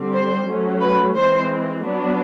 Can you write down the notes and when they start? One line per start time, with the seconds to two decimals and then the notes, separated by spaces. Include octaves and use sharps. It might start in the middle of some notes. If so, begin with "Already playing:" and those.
Already playing: D3 G3 C4
0.13 C5
0.47 F#3 A3 C#4
0.81 B4
1.15 E3 G#3 C4 C5
1.83 F#3 B3 D4